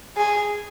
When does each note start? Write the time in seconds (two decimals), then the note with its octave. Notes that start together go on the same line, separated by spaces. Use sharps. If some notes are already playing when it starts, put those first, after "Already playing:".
0.17 G#4